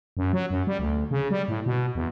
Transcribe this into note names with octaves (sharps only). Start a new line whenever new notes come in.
F#2
F#3
F#2
G3
D2
C#3
G3
A2
B2
E2